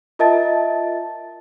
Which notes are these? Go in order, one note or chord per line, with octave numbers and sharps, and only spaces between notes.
F4 A#4 D#5 E5 A5 A6